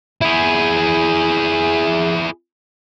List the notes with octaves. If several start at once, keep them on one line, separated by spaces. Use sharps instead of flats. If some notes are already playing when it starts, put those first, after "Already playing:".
E4 G#4